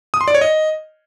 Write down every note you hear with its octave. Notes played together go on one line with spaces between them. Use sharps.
D#6
C6
D5
C#5
D#5